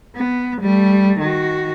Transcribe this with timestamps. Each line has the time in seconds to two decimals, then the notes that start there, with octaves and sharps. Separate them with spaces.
0.16 B3
0.61 G3 A3
1.20 D#3 F#4